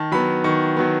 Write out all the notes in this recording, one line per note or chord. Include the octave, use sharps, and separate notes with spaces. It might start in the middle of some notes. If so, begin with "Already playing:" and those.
Already playing: D#3 A5
F#3 B3 B5
D#3 C#6
F#3 B3